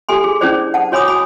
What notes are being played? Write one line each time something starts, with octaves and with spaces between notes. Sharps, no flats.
G4 A4 G#5 C6
G#4
C#4 D4 E4 G#4 C5 D5
F#5 A5
F#4 C#5 G#5 B5 D6 D#6
G#5 B5